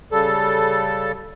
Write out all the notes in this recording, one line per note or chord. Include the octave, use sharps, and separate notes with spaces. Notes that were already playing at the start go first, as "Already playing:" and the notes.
C#3 G3 A4